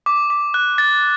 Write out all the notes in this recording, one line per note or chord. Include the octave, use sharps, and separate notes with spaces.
D6
D6
F#6
A6